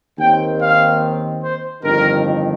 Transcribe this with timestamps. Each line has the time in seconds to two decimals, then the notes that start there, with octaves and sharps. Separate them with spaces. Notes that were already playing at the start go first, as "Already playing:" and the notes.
0.18 D#2 D#3 C4 G5
0.59 F5
1.42 C5
1.83 G1 F2 D#3 A#4